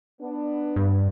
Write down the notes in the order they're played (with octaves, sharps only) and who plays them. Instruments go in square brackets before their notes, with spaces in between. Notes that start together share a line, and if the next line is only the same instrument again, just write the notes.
[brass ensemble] B3 D4
[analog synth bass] G2